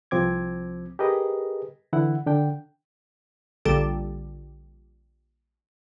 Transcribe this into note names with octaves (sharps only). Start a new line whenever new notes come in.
C2 F3 C4 D6 G#6
G4 G#4 A#4 B4 D#5
D3 E3 E4 F#5
D3 D4 G5
A#1 D3 G3 A4